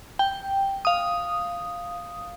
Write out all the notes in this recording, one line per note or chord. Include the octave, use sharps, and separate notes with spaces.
G5
F5 D#6